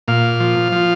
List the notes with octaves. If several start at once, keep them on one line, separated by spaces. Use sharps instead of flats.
A#2 F5
F3
F3